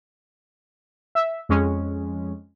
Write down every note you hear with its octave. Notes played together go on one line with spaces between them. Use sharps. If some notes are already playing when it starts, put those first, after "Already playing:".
E5
F2 G#3 C#4